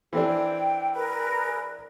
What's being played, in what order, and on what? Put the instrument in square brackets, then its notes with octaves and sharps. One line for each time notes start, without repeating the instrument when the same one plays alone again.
[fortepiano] E3 C4 D4 [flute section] G4 A4
[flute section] G5
G#4 A#4 B4